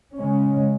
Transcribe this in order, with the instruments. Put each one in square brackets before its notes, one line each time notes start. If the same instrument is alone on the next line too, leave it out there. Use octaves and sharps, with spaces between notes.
[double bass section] C#3 G#3 C#4